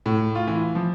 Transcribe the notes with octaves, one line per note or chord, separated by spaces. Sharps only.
A2
F4
E3
F3